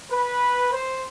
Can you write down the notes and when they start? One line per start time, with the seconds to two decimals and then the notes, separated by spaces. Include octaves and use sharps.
0.11 B4
0.73 C5